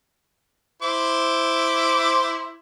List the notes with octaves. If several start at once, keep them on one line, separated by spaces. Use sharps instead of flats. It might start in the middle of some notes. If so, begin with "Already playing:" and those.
E4 C5 D6